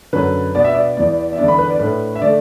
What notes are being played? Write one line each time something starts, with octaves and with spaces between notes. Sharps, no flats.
F#2 D3 F#3 B4
B2 B3 D4 D5
E5
D5
E2 E3 B3 D5
E5
E2 D3 B3 D4 D5
B5
B4
D5
A2 A3 D4 B4
E5
D3 A3 D4 D5